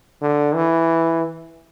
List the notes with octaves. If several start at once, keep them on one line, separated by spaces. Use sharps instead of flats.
D3
E3